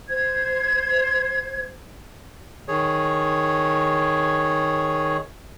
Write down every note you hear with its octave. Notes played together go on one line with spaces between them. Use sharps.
C5 G#6
D#3 G#4 C#5